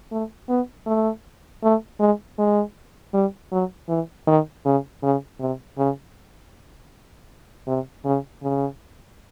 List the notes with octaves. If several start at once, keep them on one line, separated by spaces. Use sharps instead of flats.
A3
B3
A3
A3
G#3
G#3
G3
F#3
E3
D#3
C#3
C#3
C3
C#3
C3
C#3
C#3